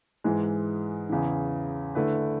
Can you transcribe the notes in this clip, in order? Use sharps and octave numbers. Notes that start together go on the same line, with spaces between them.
G#2 E3 G#3
E2 C#3 E3
D3 A3 E4 B4